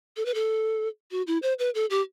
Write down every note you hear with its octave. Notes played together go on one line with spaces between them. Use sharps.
A4
B4
A4
F#4
E4
C5
B4
A4
G4